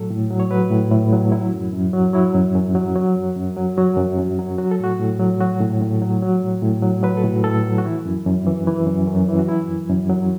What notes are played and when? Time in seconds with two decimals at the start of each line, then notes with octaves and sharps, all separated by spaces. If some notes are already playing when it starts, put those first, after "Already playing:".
Already playing: A2 F#3 A4
0.10 A2
0.31 F#3
0.40 C#5
0.51 F#3 B4
0.71 A2
0.92 A2
1.13 F#3
1.32 F#3 E4
1.53 F#2
1.73 F#2
1.93 F#3
2.13 F#3 E4
2.34 F#2
2.55 F#2
2.75 F#3
2.95 F#3
3.15 F#2
3.37 F#2
3.57 F#3
3.77 F#3 F#4
3.97 F#2
4.18 F#2
4.39 F#3
4.58 F#3 F#4
4.71 A4
4.80 A2 F#4
4.99 A2
5.20 F#3
5.41 F#3 F#4
5.61 A2
5.81 A2
6.01 F#3
6.22 F#3
6.43 A2
6.63 A2
6.82 F#3
7.03 F#3 B4
7.17 A4
7.24 A2
7.30 F#4
7.44 A2 A4
7.64 F#3
7.78 F#4
7.85 E3 E4
8.06 F#2
8.26 F#2
8.47 E3
8.67 E3
8.87 F#2
9.08 F#2
9.28 E3
9.39 F#4
9.48 F#3 E4
9.68 F#2
9.89 F#2
10.09 F#3